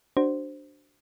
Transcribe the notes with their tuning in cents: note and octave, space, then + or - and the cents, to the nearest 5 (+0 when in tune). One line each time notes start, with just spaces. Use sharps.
D4 +0 F#4 +20 C5 +0